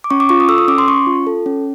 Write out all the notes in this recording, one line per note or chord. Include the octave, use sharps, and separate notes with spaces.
D6
C#4 C#6
D6
F4 C#6
D#6
A4 E6
D#6
C#4 D6
C6
C#4 C#6
F4
A4
C#4